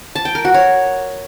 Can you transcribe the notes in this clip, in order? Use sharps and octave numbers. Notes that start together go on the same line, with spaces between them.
A5
G5
A#4
F#4
C#5